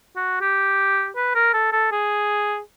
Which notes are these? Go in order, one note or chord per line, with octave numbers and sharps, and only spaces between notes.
F#4
G4
B4
A#4
A4
A4
G#4